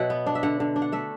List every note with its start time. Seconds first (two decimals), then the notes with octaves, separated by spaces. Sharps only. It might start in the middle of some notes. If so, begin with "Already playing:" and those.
Already playing: B2 F#3 E5 F#5
0.10 B3
0.26 D4
0.35 E5
0.43 D3 F#5
0.60 D3
0.76 D4
0.82 F#5
0.92 A3 E5